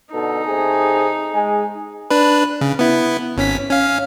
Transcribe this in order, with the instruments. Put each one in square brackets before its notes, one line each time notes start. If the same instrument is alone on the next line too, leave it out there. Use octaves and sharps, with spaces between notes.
[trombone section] B2 D3 A4 [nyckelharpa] D#4
[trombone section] C3 A3 G#4
G#3 G#4
[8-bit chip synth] D4 B4
C#3
B3 E4
G#1 C#4 B6
C#4 F5